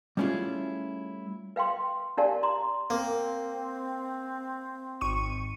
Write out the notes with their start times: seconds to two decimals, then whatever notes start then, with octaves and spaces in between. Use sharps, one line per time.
0.17 G3 A3 C#4 E4 F4 G#4
1.56 B4 F5 G5 C6
2.17 D4 G4 A#4 D5 F5 A5
2.43 A#5 C6
2.90 A#3 C4
5.01 G#1 C#6 D#7